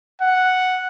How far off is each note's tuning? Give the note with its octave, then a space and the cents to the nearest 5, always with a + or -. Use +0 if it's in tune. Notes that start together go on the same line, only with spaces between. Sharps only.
F#5 +0